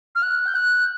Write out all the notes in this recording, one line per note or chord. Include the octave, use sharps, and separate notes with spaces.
F6
F#6
G6
F#6